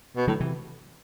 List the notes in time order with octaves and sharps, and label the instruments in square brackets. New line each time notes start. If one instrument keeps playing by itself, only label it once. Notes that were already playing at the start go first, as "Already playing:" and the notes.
[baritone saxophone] B2
[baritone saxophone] A2 [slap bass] D3 F#3
[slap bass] C3 E3